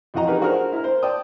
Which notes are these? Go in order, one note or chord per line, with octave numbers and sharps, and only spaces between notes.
F2 E3 F4 F#4 D#5 A#5
D#4 G4 G#4 A#4 B4
D4 F#4 G#4 A#4 C5
E4 A#4
C5
D5 G5 A5 D#6